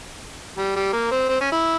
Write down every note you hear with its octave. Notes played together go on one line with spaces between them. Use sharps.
G3
G3
A#3
C4
C4
C#4
E4